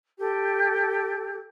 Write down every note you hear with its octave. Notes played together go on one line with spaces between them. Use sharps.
G4 A4